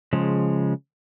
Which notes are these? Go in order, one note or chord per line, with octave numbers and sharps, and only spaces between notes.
C#3 F3 G#3